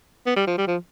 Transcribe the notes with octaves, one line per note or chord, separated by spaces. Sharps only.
B3
G3
F3
G3
F3